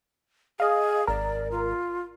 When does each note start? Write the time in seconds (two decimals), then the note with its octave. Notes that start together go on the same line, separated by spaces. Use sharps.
0.60 G#4 D#5 F5
1.07 G#1 A#4 D5
1.51 F4